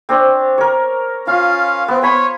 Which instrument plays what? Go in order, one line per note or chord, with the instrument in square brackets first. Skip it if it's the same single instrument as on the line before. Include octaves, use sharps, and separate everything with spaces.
[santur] C4 D4 C#5
A#4 C#5
[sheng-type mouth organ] C#4 F5 [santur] F4
[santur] B3 [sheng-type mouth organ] C4
[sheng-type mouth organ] C#5 [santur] G#5 B5 C6